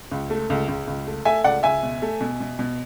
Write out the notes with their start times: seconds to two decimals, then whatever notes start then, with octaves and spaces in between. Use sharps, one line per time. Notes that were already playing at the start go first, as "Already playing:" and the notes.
0.11 C#2
0.30 A3
0.50 C#2
0.68 C#2
0.87 C#2
1.07 A3
1.25 A3 E5 G#5
1.44 C#2 D5 F#5
1.63 C#2 E5 G#5
1.83 B2
2.02 A3
2.21 B2
2.40 B2
2.59 B2